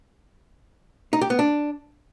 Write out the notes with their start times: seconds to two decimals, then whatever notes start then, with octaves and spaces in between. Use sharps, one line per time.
1.13 D#4
1.21 G4
1.30 B3
1.39 D4